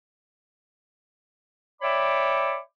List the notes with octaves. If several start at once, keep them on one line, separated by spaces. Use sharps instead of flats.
C#5 D5 E5 G5 B5 D6